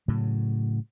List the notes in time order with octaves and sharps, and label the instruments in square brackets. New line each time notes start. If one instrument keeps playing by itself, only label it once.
[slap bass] A2 C#3 F#3